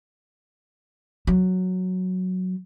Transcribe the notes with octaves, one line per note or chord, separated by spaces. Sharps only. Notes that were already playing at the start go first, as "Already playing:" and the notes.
F#3